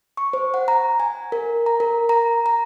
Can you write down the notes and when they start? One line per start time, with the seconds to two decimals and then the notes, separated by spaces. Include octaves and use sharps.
0.17 C#6
0.33 C5
0.54 F#5
0.68 A#5
1.00 G#5
1.32 A#4
1.66 A#5
1.80 A#4
2.09 A#5
2.46 A#5